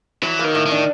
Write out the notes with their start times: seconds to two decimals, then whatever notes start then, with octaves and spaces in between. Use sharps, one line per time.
0.23 E3 F#3
0.39 D#3 A#3
0.55 A2
0.66 D#3
0.71 D4